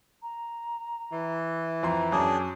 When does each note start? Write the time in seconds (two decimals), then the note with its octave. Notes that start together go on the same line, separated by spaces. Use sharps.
0.22 A#5
1.12 E3
1.83 F2 A#5 C6
2.12 F#2 D4 G#4